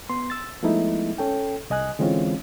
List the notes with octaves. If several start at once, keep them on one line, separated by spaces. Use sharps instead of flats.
B3 C6
E6 A6
F3 G#3 A3 B3 D#4 E4
C#4 A4 G5
C2 D#5 G#5 F#6
D3 E3 G#3 C4 C#4 F4